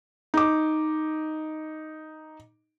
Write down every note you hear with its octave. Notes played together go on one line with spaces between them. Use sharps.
D#4 D6